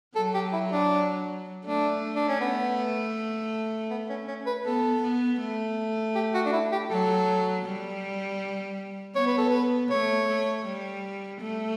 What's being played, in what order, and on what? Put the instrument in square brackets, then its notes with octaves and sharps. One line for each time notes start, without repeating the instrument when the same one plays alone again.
[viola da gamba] F#3 [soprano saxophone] A4
[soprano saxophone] G4
E4
D4
[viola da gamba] A3 [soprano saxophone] D4
[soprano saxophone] D4
C#4
B3
B3
C#4
C#4
B4
[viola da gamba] B3 [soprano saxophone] A4
[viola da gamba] B3
A3
[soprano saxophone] G4
F#4
D4
E4
G4
[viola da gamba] F#3 [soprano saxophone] A4
[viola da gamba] G3
[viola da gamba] B3 [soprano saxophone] C#5
[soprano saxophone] B4
A4
B4
[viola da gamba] A3 [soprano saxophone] C#5
[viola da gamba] A3
G3
A3